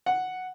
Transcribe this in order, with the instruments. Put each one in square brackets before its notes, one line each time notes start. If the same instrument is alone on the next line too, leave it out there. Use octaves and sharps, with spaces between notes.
[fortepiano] F#5